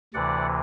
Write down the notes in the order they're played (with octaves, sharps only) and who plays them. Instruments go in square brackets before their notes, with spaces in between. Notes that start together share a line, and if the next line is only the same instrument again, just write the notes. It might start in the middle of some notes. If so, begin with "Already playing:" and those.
[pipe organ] D2 C3 E3 D5 F#5